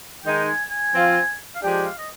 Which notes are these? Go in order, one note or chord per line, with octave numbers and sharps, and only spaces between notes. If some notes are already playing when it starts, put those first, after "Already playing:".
D#3 G#3 D#4 G5
G#5
G#5
F3 C4 F4
F5
F3 G#3 D4 G4 G5
F5
D#5